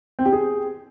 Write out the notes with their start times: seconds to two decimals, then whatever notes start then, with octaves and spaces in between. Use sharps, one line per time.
0.19 C4
0.26 G4
0.32 G#4